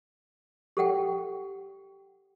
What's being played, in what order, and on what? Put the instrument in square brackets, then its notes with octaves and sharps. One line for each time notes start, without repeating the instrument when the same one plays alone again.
[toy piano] G4 A4 F#5 G5